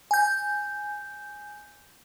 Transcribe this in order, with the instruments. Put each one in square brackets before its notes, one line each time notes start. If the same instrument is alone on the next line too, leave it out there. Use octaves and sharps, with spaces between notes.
[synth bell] G#5 G6